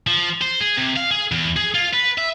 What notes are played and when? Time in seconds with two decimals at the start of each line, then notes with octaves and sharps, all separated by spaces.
0.07 F3
0.42 C5
0.60 G#4
0.77 C3
0.96 F5
1.11 G#4
1.32 E2
1.57 G#4
1.75 F4
1.93 B4
2.18 E5